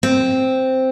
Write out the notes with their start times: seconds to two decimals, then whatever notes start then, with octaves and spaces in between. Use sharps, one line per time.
0.03 C4